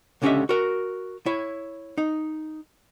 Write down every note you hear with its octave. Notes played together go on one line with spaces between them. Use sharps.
C#2 D3 C#4 G4 D#5 E5
F#4 A#4
E4 C#5
D#4